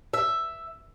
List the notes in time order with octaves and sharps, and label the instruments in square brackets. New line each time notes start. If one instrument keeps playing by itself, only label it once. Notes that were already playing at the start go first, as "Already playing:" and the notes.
[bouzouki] E5